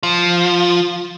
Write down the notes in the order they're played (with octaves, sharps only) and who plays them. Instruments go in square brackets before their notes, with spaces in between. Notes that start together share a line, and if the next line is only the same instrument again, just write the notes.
[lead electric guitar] F3